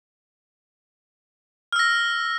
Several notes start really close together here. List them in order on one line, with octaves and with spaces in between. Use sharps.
F6 E6 A#6